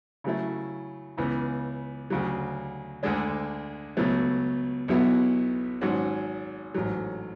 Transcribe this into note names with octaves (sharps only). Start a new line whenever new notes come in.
C#3 F#3 A3 E4
C#2 C#3 E3 B3
D2 C#3 F#3
D2 D3 G#3 D4
C#2 B2 F#3 A3
B1 B2 F#3 B3 E4
G#1 G#2 F#3 C#4 F#4
A1 G#2 F#3